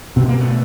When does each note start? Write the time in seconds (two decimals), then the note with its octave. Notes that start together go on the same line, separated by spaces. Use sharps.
0.16 B2 B3
0.28 A#3
0.40 A3 B3